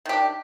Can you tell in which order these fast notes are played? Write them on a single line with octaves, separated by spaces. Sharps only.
D#3 G4 D4